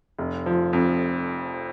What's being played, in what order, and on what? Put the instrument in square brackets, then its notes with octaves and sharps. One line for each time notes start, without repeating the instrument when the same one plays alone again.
[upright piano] F1
F3
F2